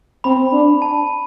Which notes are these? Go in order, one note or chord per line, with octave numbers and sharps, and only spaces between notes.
C4 B5
D4
A5